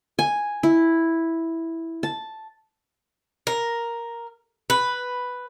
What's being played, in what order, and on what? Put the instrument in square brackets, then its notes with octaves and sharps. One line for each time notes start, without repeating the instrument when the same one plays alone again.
[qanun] G#5
E4
A5
[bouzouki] A#4
B4